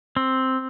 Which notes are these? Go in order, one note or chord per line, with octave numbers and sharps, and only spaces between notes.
C4